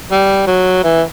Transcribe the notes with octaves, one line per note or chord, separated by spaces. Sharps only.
G3
F#3
E3